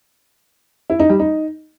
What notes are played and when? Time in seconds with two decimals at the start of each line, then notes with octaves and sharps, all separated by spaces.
0.90 E4
1.00 D#4
1.09 G3
1.19 D#4